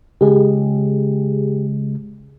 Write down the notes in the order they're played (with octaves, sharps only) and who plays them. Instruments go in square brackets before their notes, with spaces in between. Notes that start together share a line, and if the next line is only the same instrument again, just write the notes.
[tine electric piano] C#3 G#3 [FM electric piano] G4 G#4